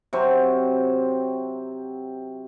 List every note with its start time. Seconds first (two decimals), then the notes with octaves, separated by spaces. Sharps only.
0.13 C3 F#3 C4 C#6